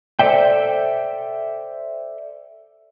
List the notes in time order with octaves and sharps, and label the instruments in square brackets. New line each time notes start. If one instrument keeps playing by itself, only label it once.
[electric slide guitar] A4 C5 D5 E5 G5